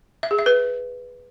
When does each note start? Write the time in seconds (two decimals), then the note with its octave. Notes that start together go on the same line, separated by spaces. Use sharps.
0.23 E5
0.31 G#4
0.38 E5
0.46 B4